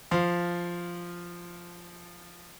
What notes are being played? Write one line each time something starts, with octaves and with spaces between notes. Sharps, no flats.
F3 F5 C6